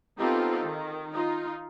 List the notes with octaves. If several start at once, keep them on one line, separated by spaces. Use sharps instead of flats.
B3 C4 D#4 F4 G4 A4
D#3
D#4 F4